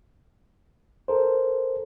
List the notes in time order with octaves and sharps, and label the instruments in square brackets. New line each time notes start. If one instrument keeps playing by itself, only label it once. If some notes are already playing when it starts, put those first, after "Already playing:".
[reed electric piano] A4 A#4 C5